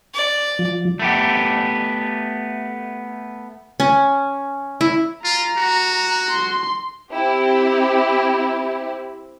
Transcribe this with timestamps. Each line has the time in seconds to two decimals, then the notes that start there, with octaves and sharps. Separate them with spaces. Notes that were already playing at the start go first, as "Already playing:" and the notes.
0.14 D5
0.59 F3
0.99 A3 B3 G4
3.80 C#4
4.81 E4
5.24 F4 A#5
5.58 F#4
6.29 C6
7.12 C4 E4 G4